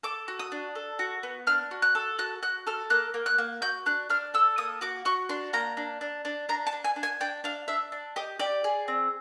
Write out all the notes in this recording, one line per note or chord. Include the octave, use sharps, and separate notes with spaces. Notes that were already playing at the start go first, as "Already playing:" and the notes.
A4 D6
F#4
D#6
D4
A4
F#4
B3
D4 F6
F#4
F#6
A4
F#4 F#6
F#4 F#6
A4 F6
A#3 F#6
A#3
F#6
A#3
F#4 G6
D4 F#6
D4 F6
A4 E6
A#3 D#6
F#4 D6
F#4 C#6
D4 C6
A#3 A#5
D4
D4
D4
D4 A#5
A5
D4
G#5
D4
G#5
D4 G5
D4 F5
D4 E5
D4
G4 D#5
G4 D5
G#4
C4